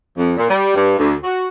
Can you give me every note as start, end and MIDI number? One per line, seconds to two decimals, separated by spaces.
0.17 0.34 41
0.37 0.45 46
0.49 0.75 55
0.75 0.98 43
0.99 1.14 38
1.24 1.48 66